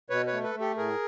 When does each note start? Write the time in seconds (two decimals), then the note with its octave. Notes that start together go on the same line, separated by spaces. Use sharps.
0.10 B2 B4 C#5
0.27 B4 C#5
0.33 A3
0.44 A4 B4
0.55 A3
0.60 G4 A4
0.77 A2 G#4 A#4